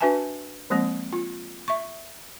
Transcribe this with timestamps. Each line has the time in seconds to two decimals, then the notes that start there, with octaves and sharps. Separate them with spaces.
0.01 D4 F#4 B4 E5 G#5 A5
0.70 F3 G#3 A#3 C4
1.13 F4
1.68 E5 C#6